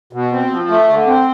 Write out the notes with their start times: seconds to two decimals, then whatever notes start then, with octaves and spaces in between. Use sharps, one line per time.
0.13 B2
0.32 C4
0.51 F3
0.69 A3
0.89 D3
1.07 C4